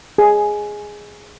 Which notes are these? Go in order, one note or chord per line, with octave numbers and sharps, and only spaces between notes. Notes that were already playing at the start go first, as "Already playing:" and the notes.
G#4